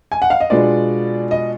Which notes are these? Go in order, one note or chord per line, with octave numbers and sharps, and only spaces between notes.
G#5
F#5
F5
D#5
B2 G#3 B3 D4 F4 D5
D#5